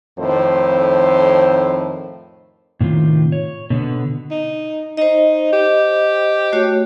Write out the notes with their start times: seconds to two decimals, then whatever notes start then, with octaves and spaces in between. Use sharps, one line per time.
0.19 F2 A2 D#3 C5
2.81 A2 C3 D#3 F4
3.32 C#5
3.70 B2 D3 B3
4.31 D#4
4.97 D#4 C5 D#5
5.52 G4
6.52 A3 F#4 C#5